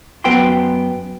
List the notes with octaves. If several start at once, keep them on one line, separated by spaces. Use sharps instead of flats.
F#2 B3 G5 C6